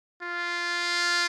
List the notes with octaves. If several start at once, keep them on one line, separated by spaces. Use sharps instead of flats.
F4